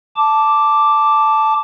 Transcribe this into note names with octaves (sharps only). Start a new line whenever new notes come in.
A5 D6